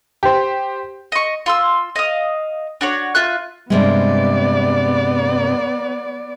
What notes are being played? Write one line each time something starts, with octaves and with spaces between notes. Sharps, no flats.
G4 C5
D#5 C#6
F4 C6 E6
D#5 F5 D#6
D4 F#4 C#5
F4 E5 F#6
G2 C3 G#3 B3 D5